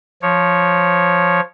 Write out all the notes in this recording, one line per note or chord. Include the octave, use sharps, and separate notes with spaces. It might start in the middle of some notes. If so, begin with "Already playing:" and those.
F3 C#5